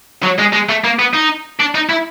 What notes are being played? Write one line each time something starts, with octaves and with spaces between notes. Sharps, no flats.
F#3
G#3
G#3
A3
A#3
B3
D#4
D4
D#4
E4